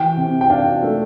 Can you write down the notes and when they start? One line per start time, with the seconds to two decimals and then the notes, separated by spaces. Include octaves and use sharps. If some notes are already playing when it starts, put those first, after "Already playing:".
Already playing: E3 G5
0.17 C3
0.41 G5
0.50 D4 F5
0.83 A3